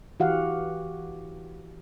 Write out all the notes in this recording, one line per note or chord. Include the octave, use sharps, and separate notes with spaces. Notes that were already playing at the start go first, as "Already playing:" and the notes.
E3 F#4 G4 F5 F#5